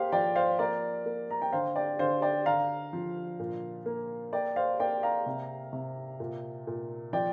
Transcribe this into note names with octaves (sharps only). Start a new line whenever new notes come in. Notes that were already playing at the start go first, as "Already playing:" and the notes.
Already playing: A#3 G4 C5 F5
F3 D5 G5
C5 F5
A#3 A#4 D5
A#3
A#5
G5
D3 C5 F5
D5 G5
D3 C5 F5
D5 G5
D3 F5 A#5
F3
A#2
A#3
A#3 D5 G5
C5 F5
A#3 D5 G5
F5 A#5
C3
C3
A#2
A#2
F3 D5 G5